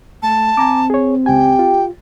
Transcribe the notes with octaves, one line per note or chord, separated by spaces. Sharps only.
A3 A5
C4 G#5 A#5 D6
G#4 C#5
C#2 G4 G5 G#5
F4